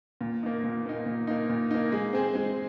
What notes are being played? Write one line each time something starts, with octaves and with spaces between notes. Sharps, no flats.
A#2
A#3 D#4
A#2
A#3 D#4
A#2
A#3 D#4
A#2
A#3 D#4
G#3
C4 G#4 C5
G#3